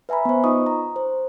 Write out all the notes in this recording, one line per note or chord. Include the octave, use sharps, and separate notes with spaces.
B4 E5 G#5 A#5 B5
B3 C5
D#4 F4 D#5 C#6 D#6
A#5
C5